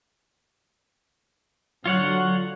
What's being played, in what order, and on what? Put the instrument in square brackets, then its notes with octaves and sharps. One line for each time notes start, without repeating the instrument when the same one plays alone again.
[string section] D3 F#3 [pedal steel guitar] F4 C#5 F#5